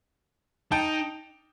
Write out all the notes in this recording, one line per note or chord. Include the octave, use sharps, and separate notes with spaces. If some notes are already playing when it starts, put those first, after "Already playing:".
D#4 G5 A5